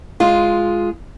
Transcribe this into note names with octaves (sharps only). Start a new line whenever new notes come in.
G#3 F4